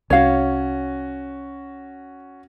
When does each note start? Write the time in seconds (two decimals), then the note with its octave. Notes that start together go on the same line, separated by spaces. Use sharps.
0.10 C2 C#4 F#4 C#5 F5